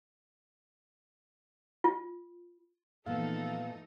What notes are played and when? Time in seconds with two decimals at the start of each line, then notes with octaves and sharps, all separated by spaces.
1.84 F4
3.06 A#2 E3 F3 A3 B3 D#4 A4 F5